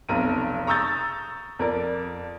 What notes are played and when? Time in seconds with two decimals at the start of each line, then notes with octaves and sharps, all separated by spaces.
0.09 F1 B1 A#5 D#7
0.67 A#5 C#6 D#6 E6 G6 A6
1.59 F2 A#4 D5